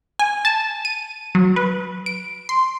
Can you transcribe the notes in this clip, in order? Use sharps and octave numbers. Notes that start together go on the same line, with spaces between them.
G#5
A5
D#7
F#3
B4
D7
C6